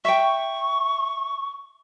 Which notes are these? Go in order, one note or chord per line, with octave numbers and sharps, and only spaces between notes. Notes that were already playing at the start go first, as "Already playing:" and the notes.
E5 G5 C#6